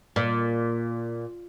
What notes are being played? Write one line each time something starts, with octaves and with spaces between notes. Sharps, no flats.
A#2